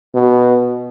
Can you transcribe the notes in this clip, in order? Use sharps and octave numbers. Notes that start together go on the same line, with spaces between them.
B2